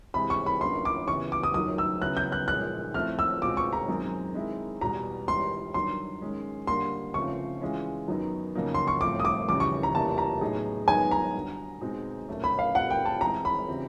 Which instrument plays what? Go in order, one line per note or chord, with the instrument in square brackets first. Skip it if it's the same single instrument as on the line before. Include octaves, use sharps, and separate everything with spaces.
[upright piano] C3 E3 G#3 C4 [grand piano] B5
[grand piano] C#6
B5
[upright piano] D3 F#3 A#3 C#4 [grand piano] C6
[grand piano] D6
[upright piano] C#3 E3 G3 B3 [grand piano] C#6
[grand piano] D6
D#6
[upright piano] F#2 D#3 F#3 [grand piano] D#6
[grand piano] E6
[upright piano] C#3 F#3 B3 E4 [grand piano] F#6
[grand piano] G6
F#6
[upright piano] A#2 F3 G#3 [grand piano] F#6
[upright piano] F3 A3 C4 E4 [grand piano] F6
[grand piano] E6
[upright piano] B2 G#3 C4 F4 [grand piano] D6
[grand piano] C#6
A#5
[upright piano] F#2 D#3 G#3 C4
D#3 G#3 C4 E4
[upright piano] E2 B2 G3 [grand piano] A#5
[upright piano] G#2 E3 G3 [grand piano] C6
[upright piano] G2 D#3 F#3 [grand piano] C6
[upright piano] G#2 D#3 G#3 C#4
[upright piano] G2 D3 G3 A#3 [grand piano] C6
[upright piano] C#3 F3 A3 C4 F4 [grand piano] C#6
[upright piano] E3 G#3 C#4 F4
F#2 D#3 F#3 B3 D#4
F2 C#3 F#3 A#3 D#4
[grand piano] C6
C#6
[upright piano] A2 F3 A3 C4 F4 [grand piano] D6
[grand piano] D#6
D6
[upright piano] F2 C#3 E3 G3 [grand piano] D6
[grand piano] C#6
A#5
[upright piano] E2 C3 E3 G3 A#3 [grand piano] A5
[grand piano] A#5
[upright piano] A2 F#3 B3 D#4 G#4
[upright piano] F#2 D#3 G#3 B3 D#4 [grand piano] G#5
[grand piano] A#5
[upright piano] G2 D3 F#3
B2 G#3 C4 D#4
A#2 F#3 A3 C#4
[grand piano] B5
F5
[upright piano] A#2 G3 C4 F4 A4 [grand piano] F#5
[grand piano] G5
A5
[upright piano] E3 G#3 C4 [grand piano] A#5
[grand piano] B5
[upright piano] C#3 E3 G3 C4 E4